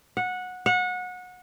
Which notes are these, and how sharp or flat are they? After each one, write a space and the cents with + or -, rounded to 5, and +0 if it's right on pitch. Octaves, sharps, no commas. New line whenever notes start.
F#5 -15
F#5 -25